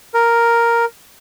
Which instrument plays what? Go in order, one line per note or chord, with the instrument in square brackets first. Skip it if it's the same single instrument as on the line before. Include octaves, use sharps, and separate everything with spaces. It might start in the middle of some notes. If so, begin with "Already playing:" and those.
[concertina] A#4